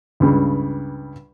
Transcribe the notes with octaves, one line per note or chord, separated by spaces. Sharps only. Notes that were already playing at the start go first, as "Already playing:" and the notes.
C#2 G2 C#3